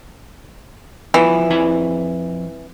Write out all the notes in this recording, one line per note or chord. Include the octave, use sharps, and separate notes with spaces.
E3 F3 B3 E4
F2 E4 G#5